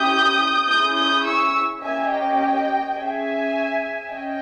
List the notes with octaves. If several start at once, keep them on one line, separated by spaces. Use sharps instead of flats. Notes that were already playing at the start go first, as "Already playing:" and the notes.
Already playing: C#4 E4 G4 D#6 G6
C#4 E4 G#4 D#6 G6
D#6 G6
C#6 E6
A#3 C#4 G4 E5 G#5
D#5 G5
C#4 G#4 E5 G#5
C#4 D#5 G5